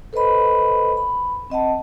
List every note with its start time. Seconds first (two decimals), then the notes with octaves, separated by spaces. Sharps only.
0.13 A4 B4 C5 D#5 B5
0.97 B5
1.50 C4 D#5 F#5 A5